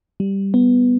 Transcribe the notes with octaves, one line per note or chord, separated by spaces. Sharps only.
G3
B3